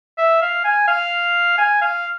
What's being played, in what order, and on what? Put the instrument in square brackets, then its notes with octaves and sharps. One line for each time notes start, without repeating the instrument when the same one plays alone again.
[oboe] E5
F5
G#5
F5
G#5
F5